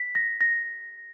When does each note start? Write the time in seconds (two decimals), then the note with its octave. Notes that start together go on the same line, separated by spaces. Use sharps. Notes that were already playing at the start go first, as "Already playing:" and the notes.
Already playing: B6
0.15 A#6
0.41 A#6